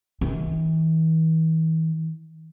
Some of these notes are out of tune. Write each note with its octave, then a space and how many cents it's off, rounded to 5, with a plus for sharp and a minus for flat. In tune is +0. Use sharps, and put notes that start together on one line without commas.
E3 -40